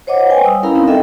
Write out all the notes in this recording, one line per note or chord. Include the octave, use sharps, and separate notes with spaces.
C5 C#5 D#5 F#5 D6
B4 G5 G#5
G3 D#6 E6
C#4 E4 A#4 F5 A#5 B5
C4 D#4
A4 D#5 E5 G5